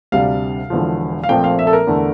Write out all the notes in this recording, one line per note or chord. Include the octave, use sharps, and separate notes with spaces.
D2 C3 G3 D4 F5
E1 E2 D3 F3
F5
A#1 A#2 F3 A3 C4 G5
F5
E5
A4
A#4
E2 D3 A3 D4